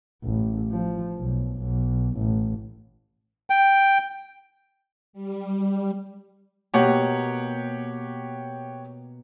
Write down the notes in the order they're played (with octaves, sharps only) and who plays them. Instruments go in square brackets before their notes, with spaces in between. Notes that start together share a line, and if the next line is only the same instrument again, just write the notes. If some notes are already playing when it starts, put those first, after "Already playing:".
[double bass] A1
F3
B1
B1
A1
[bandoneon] G5
[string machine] G3
[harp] B2 A#3 [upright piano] G4 C#5 F#5